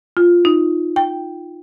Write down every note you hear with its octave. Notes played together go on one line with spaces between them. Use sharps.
F4
D#4
G5